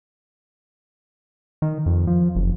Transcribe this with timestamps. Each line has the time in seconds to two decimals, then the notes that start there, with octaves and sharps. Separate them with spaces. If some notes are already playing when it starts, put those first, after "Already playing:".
1.62 D#3
1.86 F2
2.07 F3
2.35 F#1